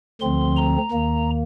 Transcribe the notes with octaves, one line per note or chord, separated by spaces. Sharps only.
D2 D3 F3 C4 C6
A#5
D#2 D#3 A#3